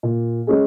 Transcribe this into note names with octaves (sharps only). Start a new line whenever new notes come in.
A#2
G#3 C#4 G#4